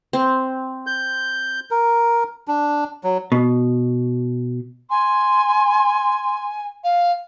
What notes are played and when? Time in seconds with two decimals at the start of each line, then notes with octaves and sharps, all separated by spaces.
0.13 C4
0.87 G6
1.71 A#4
2.48 D4
3.04 F#3
3.32 B2
4.90 G#5 C6
6.84 F5